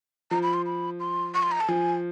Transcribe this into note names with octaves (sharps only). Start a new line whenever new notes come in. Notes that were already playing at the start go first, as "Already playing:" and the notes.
F3 A#5
B5
C6
B5
C6
C#6
C6
A#5
A5
F3 G#5